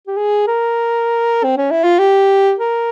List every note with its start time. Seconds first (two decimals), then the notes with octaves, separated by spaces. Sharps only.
0.07 G4
0.17 G#4
0.47 A#4
1.44 C4
1.58 C#4
1.71 E4
1.84 F4
1.99 G4
2.59 A#4